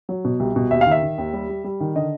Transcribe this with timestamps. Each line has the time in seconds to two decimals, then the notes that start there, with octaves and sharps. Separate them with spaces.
0.09 F#3
0.24 B2
0.40 C2
0.56 B2
0.71 D#2 E5
0.81 F5
0.86 D#3
0.91 E5
1.03 D#3
1.18 D#2
1.33 G3
1.49 G3
1.64 G3
1.80 D#3
1.95 D3 D#5